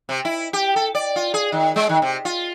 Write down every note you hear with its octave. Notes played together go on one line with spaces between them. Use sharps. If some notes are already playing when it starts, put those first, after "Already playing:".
C3
E4
G4
A4
D5
F4
G#4
D#3
G#3
D#3
C3
F4